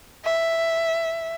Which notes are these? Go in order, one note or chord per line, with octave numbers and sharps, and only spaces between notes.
E5